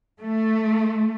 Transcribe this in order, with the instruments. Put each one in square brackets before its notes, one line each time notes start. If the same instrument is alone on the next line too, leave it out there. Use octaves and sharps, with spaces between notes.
[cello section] A3